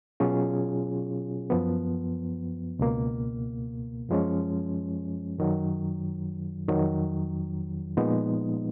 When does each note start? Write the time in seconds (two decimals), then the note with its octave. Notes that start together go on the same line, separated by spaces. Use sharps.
0.20 B2 F#3 C#4 F4 G#4
1.50 F#2 F3 B3
2.79 C#2 B2 A#3
4.09 F#2 F3 G#3 C#4
5.38 F#2 D#3 F#3
6.68 F2 D#3 F#3
7.97 A#2 F3 G#3 B3 D#4